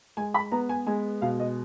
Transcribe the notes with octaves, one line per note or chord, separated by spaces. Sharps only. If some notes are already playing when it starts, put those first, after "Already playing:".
G#3 G#5
B5
B3 A#5
G#5
G#3 G#5
B2 F5
D#5